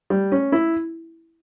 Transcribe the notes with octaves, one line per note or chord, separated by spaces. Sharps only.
G3
C#4
E4